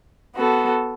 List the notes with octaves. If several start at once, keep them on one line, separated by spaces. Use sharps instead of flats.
B3 F#4 A4